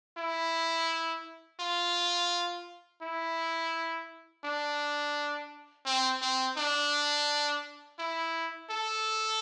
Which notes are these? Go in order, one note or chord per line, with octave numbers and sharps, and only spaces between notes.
E4
F4
E4
D4
C4
C4
D4
E4
A4